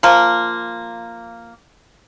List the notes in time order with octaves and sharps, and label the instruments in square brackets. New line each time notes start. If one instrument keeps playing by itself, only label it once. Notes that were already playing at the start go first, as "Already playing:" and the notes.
[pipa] F3 A#3